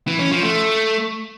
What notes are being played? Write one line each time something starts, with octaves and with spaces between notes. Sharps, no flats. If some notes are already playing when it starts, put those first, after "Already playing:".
E3
C#4
F3
A3